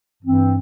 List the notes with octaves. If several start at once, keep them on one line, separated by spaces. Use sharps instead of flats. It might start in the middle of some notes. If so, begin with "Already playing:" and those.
G2 E3 C4